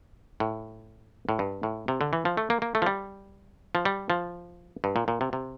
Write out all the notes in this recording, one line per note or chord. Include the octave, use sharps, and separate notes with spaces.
A2
A2
G2
A2
C3
D3
E3
F3
A3
A#3
A#3
A3
F3
G3
F3
G3
F3
G2
A#2
A#2
C3
C3